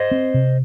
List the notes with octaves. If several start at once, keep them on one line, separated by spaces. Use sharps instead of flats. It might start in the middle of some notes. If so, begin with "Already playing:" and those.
Already playing: C5 D#5
C4
C3